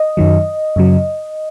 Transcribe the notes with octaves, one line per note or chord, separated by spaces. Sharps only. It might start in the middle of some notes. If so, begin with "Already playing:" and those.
Already playing: D#5
F#2 D#3 F#3
F#2 C#3 F#3